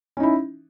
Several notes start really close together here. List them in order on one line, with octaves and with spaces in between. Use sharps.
C#4 D#4 E4